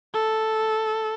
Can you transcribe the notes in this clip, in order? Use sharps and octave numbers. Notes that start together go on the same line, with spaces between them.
A4